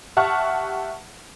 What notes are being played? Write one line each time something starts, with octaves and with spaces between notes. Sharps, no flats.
G4 E5 F#5 A5 C#6 F6